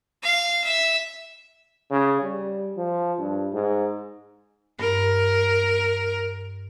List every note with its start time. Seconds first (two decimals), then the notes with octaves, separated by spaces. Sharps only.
0.23 F5
0.64 E5
1.90 C#3
2.22 G3
2.77 F3
3.19 G2
3.53 G#2
4.79 G2 A#4